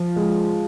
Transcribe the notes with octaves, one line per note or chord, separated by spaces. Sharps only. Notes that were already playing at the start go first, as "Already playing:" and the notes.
Already playing: F3
G#3